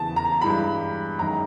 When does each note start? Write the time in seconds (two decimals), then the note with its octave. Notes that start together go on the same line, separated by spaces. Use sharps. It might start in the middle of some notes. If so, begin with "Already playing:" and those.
Already playing: E2 C#3 E3 A5
0.16 A#5
0.41 G2 E3 G#3 B5
1.19 F#2 D#3 G#3 A#5